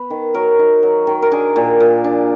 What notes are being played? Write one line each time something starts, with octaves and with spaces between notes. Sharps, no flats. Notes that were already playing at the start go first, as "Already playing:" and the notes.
Already playing: B3 B4
D#3
F#3 A#4
D#4
F#3
D#3
A#4
D4 G#4
A#2
A#2
D4